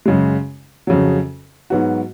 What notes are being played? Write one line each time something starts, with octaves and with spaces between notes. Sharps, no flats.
F#2 C#3 G#3
F2 C#3 F#3
G#2 F#3 B3 F#4